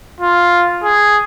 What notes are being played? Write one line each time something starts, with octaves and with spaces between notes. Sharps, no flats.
F4
G#4